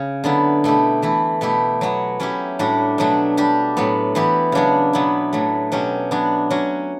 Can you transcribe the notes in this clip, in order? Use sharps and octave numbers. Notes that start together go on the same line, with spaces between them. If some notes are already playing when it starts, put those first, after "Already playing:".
Already playing: C#3
D3 F#3 B3 E4
B2 A3 E4 G4
E3 A3 E4
B2 A3 E4 G4
F#3 B3 F#4
F#3 C#4 E4 G4
A2 G3 D4 F#4
B2 F#3 A3 D4
G3 D4 G4
A2 F#3 B3
E3 B3 E4 G4
C#3 F#3 B3 D4
B2 F#3 B3 E4
A2 F#3 A3
B2 F#3 C#4 G4
F#3 B3 D4
F#3 C#4 F#4